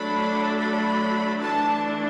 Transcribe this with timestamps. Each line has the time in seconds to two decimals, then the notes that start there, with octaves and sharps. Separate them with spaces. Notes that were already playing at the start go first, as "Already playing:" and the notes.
Already playing: F#3 A3 D4 B5
0.59 B5
1.41 E3 A3 D4 A5